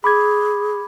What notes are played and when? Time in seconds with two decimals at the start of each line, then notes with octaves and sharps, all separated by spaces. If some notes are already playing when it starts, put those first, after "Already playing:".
0.04 G#4 B5 D6 G#6